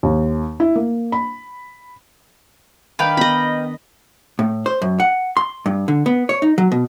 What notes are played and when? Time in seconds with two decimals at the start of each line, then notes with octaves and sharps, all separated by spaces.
0.03 D#2
0.60 E4
0.76 A#3
1.12 B5
2.99 D#3 D4 B4 F5 G5
3.17 B3 D#5 B5
4.39 A2
4.66 C5
4.82 F#2
5.00 F#5
5.37 C6
5.66 G2
5.88 D3
6.06 B3
6.29 C#5
6.42 D#4
6.58 F#3
6.72 B2